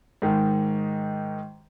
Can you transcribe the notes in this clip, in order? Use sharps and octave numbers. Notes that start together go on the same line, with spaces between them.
G#2 D#3